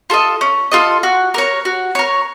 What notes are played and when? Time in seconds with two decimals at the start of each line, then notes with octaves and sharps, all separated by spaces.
0.10 F4 A4 D#5
0.41 C#4
0.72 F4 A4 D#5
1.03 F#4
1.34 A#4 C#5
1.65 F#4
1.95 A#4 C#5